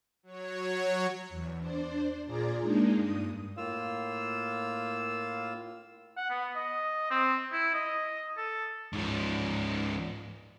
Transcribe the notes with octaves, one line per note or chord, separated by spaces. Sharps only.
F#3 C#5
E2
D4 C5 D5
A#2 F4 G#4 D5 A#5
G#3 A#3 D4 D#4
G2 D#6
A2 A#3 F4 F5 E6
F#5
B3
D#5
C4
E4
D#5
A4
G#2 F3